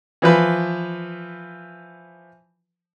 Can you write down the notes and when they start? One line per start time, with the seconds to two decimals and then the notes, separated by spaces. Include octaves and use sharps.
0.22 E3 F3 B4